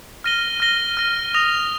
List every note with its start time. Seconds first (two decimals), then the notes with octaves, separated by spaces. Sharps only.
0.24 F6 A#6 D#7 G7
0.60 F6 A#6 D#7 G7
0.97 F6 A#6 D#7 G7
1.34 D#6 A#6 F7